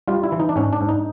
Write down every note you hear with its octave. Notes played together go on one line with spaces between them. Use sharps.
G3 F4
E4
E3
D#4
D4
G#2 C#4
D4
G#2
D#4